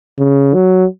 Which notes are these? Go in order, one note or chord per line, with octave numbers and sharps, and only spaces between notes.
C#3
F#3